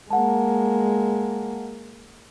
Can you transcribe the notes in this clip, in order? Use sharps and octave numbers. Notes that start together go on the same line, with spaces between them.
G#3 A#3 F#5 A5